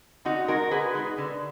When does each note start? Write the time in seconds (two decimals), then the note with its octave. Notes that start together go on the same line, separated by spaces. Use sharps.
0.25 D3 D#4 F#4
0.48 G#3 D#4 F#4 A#4
0.71 D3 G#4 B4
0.94 G#3 D#4
1.18 D3